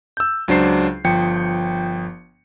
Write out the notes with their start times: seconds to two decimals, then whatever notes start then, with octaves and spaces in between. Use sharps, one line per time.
0.17 E6 G6
0.48 C#2 F#3 D4 C5 C7
1.04 G1 F3 G5 C#7